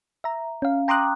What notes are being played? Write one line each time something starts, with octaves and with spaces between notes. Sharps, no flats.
E5 A#5
C#4 F5
G5 A#5 C6 D6 D#6 F#6